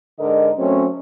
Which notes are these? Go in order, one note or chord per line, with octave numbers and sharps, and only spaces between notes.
G#2 D3 A#4 D#5
F#3 A3 C4 C#4